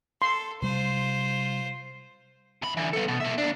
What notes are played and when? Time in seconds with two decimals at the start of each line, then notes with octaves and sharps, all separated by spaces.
0.22 A4 C6
0.62 C3 G3 F4 C5
2.62 E2 B5
2.77 D3 E3
2.93 B3 A4
3.08 B2
3.20 A#3 E5
3.38 D#2 D4